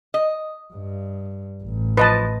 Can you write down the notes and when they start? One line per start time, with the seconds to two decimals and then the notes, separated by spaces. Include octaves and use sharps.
0.14 D#5
0.74 G2
1.63 A1
1.97 F3 B4 D#5 A5